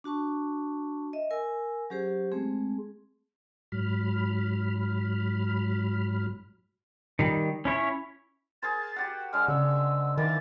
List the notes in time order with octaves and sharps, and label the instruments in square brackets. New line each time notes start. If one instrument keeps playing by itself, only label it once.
[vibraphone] D4 F#4 A5 C#6
D#5 E5
A#4 G#5 E6
F#3 C#4 G4 G#4 C5
G#3 A3 C4 G#4
[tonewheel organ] G#2 F#3 B5 F6
[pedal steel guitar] D#3 G3
C#4 E4 C#5
[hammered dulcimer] G#4 A#4 C5 [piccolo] A6
[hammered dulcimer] F#4 G4 F#5
[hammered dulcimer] D3 G#3 [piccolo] F6
[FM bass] C#3 [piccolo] E6
[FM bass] D#3 [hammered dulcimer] E3 A#3 A#4 [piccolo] A6